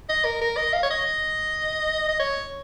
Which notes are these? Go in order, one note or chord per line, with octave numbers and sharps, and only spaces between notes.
D#5
A#4
A#4
D#5
F5
C#5
D#5
D#5
C#5